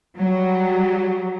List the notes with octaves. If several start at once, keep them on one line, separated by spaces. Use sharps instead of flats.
F#3 G3